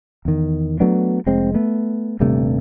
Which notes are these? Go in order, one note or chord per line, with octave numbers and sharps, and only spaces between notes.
E2 D#3
F#3 A3 B3 D4
F1 G#3 C4
A3 B3
D#1 G2 C3 A3